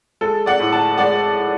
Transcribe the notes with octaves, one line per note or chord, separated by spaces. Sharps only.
G#3 A4
D5 F#5
A2
F#5 A5
G#3 D5 F#5